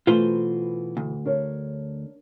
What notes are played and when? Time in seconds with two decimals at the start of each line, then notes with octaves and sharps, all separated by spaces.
0.07 B2 E3 A3 F4 B4 C5
0.97 D2
1.25 D4 A#4 C#5